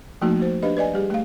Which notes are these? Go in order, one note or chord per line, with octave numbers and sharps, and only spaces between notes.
F3 A3 A#3 D#4 F#4
F#4 C5
D4 G4 B4 D#5 F5
B4 D5 D#5 G#5
G3 G4 G#4
A3 F5